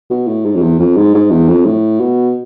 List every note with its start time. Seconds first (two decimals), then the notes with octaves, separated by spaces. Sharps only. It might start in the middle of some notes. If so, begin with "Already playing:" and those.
0.10 B2
0.28 A2
0.45 G#2
0.55 F2
0.62 E2
0.79 F2
0.97 G#2
1.14 G#2
1.31 E2
1.49 F2
1.66 A2
2.00 B2